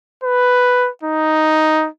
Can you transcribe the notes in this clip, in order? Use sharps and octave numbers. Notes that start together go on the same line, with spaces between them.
B4
D#4